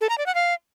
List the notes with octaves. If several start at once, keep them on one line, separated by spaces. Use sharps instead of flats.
A4
A#5
D5
F#5
F5